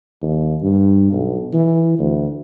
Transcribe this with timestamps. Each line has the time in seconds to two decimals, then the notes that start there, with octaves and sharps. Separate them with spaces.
0.22 D#2
0.62 G2
1.12 B1
1.53 E3
1.99 D2